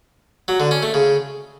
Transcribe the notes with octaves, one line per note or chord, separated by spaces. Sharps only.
F#3
D3
C#4
A3
C#3